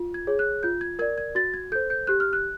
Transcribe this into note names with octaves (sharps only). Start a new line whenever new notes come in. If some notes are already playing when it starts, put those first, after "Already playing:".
Already playing: F4
G#6
G#4 C#5
F#6
F4 G6
G#6
A#4 D5 G#6
G#6
F#4 A6
G#6
A4 C5 G6
G6
G4 F#6
F6
F#6